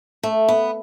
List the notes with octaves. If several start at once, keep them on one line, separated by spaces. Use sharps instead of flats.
A3
B3